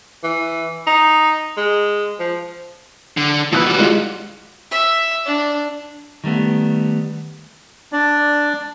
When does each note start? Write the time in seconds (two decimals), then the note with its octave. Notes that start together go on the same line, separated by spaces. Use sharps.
0.23 E3
0.87 D#4
1.57 G#3
2.20 F3
3.17 D3
3.52 B2 F3 B4 E6 F#6
3.66 G3 F#4
3.79 G#3 F4 F5
4.71 E5
5.26 D4
6.24 D#3 G3 A3 B3
7.93 D4 D5